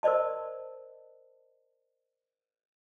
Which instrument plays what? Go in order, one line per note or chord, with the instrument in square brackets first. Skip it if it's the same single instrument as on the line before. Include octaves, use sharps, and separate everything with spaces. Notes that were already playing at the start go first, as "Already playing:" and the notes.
[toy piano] A#4 C5 D5 D#5 A5